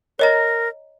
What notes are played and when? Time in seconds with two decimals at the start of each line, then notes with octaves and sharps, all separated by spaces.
0.19 A#4 C#5 D#5 A#5